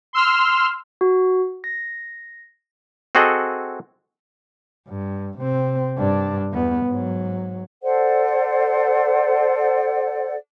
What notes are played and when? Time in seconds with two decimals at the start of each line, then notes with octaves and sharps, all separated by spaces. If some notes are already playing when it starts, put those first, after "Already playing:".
0.13 C6 E6 F6
1.01 F#4
1.64 A#6
3.15 C4 F#4 G#4 A4 D#5 F#5
4.88 G2
5.38 C3 C4
5.97 G2 D4
6.52 E2 B3
6.86 G#2 F#3
7.83 A4 C5 D5 F#5